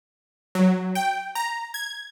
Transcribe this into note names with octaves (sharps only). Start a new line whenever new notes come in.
F#3
G5
A#5
G#6